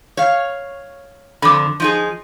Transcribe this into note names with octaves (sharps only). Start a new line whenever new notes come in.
C#5 F5
F2 D3 B5 D6
F3 D#4 G#4